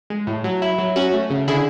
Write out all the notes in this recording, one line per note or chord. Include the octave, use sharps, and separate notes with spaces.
G#3
A2
F#3
E4
F#3
C#4 F#4
A3
C#3
D3 E4 G#4